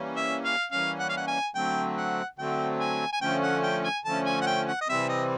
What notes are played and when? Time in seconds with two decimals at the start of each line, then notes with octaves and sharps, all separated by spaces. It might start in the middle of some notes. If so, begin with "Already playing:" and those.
Already playing: E3 G3 A#3 C#4
0.16 E5
0.45 F5
0.71 E3 G3 A#3 C#4 F5
0.99 F#5
1.09 F5
1.17 F#5
1.27 G#5
1.55 D3 F#3 A3 C4 G5
1.97 F#5
2.38 D3 F#3 A3 C4 G5
2.80 G#5
3.13 G#5
3.21 D3 F3 A3 C#4 G5
3.43 F#5
3.63 G5
3.84 G#5
4.05 D3 F3 A3 C#4 A5
4.26 G#5
4.41 F#5
4.46 G5
4.67 F#5
4.81 D#5
4.88 C3 E3 G3 C4 E5
5.09 D#5